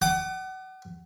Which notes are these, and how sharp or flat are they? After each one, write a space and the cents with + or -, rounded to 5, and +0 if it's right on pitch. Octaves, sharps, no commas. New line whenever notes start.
F#5 +35 D6 +40